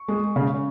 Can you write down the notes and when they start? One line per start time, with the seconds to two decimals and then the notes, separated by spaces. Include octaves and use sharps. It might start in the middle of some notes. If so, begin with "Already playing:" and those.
Already playing: C#6
0.08 G#3
0.36 C#3